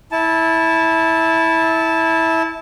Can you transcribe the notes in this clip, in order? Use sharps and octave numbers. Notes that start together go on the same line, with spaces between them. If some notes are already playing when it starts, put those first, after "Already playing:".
E4 A5